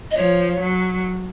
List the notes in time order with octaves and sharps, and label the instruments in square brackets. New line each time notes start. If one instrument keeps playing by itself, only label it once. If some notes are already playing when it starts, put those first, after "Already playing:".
[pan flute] D#5
[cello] F3 [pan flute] C#5
[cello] F#3